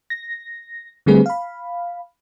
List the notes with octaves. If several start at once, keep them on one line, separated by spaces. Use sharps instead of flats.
A#6
D3 G3 A3 C4 G#4 B4
F5 B5